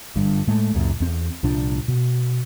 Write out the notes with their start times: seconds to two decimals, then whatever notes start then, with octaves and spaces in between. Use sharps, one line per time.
0.16 G1 G2
0.47 A2 G#3 A3
0.74 C#2 F#2 A#2
1.00 E2 C4
1.43 C2 A#2 F3 D4
1.88 B2